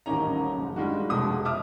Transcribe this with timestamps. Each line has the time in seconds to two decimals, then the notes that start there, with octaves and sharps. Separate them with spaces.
0.06 D#1 A1 A#3 C#4 D#4 A#5
0.57 F#1
0.76 G3 G#3 D4 D#4 F4 F#4
1.10 F1 B2 G#3 D#6
1.45 D#5 E5 A5 D6 D#6 F6